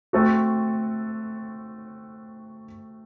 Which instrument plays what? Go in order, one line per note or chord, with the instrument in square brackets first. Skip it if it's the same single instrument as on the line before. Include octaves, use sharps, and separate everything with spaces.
[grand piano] A3 C4 F#4 A4